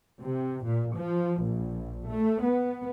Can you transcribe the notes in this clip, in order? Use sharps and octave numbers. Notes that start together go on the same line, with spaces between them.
C3
A#2
F3
A#1
A3
B3